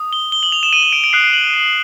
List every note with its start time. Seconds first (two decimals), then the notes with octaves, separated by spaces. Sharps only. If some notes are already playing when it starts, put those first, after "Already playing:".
Already playing: D#6
0.13 G7
0.32 G7
0.43 F#7
0.52 F7
0.63 E7
0.73 D#7
0.83 D#7
0.93 D7
1.04 D7
1.13 D#6 F#6 C7
1.24 C7
1.33 F#7
1.44 F7
1.54 D#7